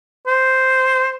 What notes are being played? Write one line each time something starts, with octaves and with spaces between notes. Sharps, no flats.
C5